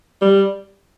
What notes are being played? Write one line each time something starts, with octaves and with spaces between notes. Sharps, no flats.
G3